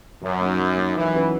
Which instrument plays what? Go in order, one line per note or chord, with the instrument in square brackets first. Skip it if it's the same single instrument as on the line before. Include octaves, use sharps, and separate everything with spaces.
[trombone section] F#2 [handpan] F#3
[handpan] A#3 D#4
F#3
A#3 D#4
[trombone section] E3 [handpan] F#3
[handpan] C#4 F#4 B4